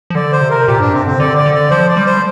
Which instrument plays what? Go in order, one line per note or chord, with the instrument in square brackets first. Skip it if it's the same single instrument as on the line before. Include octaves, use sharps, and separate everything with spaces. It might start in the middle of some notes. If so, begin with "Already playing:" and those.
[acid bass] F3
[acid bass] D3 [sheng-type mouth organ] D5
[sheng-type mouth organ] C5
[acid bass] C3
[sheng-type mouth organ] A#4
[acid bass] A#2 [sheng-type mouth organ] G4
[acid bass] G2 [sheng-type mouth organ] D4
[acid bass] C3 [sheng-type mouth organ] C4
[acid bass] D3 [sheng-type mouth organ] C4
[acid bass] D3 [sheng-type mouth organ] D5
[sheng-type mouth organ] D5
[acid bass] D3
[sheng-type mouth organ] D5
[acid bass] F3 [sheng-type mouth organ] C5
[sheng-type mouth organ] D5
[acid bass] G3
[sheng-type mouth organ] C5